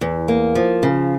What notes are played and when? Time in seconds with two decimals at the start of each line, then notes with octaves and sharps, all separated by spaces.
0.01 E2
0.28 A#3
0.55 F3
0.83 C#3